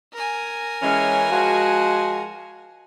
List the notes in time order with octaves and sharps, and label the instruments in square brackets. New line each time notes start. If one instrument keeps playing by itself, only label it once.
[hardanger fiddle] A#4 G#5
[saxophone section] E3 G#3 C#4
F3 G#3 F#4